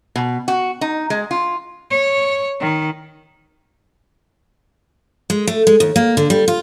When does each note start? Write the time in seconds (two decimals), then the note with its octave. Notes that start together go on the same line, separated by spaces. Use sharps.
0.16 B2
0.48 F#4
0.81 D#4
1.10 G#3
1.31 F4
1.91 C#5
2.60 D#3
5.30 G#3
5.47 A3
5.67 G#3
5.80 D#2
5.96 A#3
6.17 D3
6.30 G3
6.48 F4